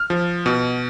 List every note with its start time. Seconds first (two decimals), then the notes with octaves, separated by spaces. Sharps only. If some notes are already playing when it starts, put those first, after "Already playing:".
Already playing: F6
0.10 F3
0.46 B2